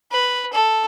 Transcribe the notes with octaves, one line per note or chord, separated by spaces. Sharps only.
B4
A4